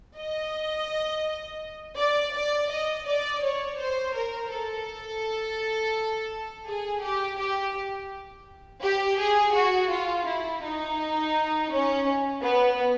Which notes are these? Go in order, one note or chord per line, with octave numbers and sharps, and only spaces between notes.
D#5
D5
D5
D#5
D5
C#5
C5
A#4
A4
G#4
G4
G4
G4
G#4
F#4
F4
E4
D#4
C#4
B3